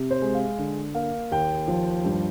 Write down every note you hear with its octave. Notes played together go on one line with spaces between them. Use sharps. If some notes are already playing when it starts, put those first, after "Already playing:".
Already playing: C3
C5
G#3
F5
D3
A#3 F5
D#2 G5
F3
G2